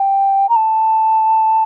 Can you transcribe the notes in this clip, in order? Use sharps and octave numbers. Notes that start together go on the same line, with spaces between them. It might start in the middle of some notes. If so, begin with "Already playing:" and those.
Already playing: G5
A#5
A5